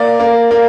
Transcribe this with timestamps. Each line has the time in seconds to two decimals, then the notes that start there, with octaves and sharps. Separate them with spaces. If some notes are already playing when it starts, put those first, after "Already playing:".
Already playing: A#3 D5
0.20 A#3
0.51 A#3